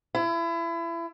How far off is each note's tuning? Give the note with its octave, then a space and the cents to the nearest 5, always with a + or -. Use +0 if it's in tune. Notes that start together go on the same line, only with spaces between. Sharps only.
E4 +30